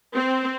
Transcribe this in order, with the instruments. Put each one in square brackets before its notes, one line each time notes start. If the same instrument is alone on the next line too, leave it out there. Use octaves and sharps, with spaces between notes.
[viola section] C4